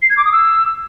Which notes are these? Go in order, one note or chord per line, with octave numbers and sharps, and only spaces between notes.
C7
G#6
D6
D#6
E6